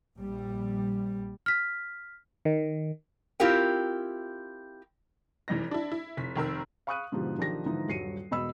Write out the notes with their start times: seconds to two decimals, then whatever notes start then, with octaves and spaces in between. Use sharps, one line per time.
0.16 A#1 G3
1.46 F6 B6
2.45 D#3
3.40 C4 E4 F4 G4 A#4 G5
5.48 F1 E3 G3 D#4 A#6
5.71 D4 E4
5.92 E4
6.17 F1 B6
6.36 F1 D#3 A#4 E6
6.87 F5 B5 C#6 D#6 F#6 D#7
7.12 G#2 B2 D3 F3 G4
7.38 B1 D#3 F3 D4 G4 A#6
7.66 G#2 D3 E3 F3 D#4
7.88 D#1 G2 F#3 C7 C#7 D#7
8.31 E1 B2 D#5 B5 E6